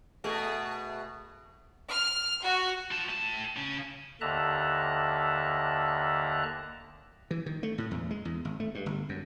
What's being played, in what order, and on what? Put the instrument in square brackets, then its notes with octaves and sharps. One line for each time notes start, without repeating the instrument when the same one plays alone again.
[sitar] B2 A3 G#4
[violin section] F6
F#4
[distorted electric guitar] F4 A5
A2 A5
C#3 C#4
[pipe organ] D#2 D3 E5 A5 A#5 F#6
[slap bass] E3
D#3
A3
A2
E2
G#3
E2
G#1
A3
G2
G1
F#2